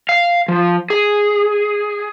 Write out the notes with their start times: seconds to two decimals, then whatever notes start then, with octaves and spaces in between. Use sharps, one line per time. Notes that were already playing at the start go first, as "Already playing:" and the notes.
0.09 F5
0.48 F3
0.90 G#4